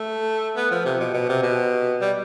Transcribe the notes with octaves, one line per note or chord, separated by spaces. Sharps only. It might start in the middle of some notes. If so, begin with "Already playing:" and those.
Already playing: A3
B3
F3
C3
B2
B2
C3
B2
G3